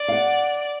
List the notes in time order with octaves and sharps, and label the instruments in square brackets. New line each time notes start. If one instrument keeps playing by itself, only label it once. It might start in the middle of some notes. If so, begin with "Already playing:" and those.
Already playing: [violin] D5
[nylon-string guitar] F5
F#5